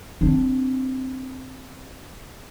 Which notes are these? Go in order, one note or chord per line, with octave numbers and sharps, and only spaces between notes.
C4 D4